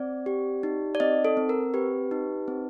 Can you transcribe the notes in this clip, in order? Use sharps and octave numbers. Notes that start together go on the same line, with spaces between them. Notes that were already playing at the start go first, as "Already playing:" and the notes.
Already playing: C4 D5
G4
D#4
D5
C4 D#5
A4
C4
A#4
G4 B4
D#4
C4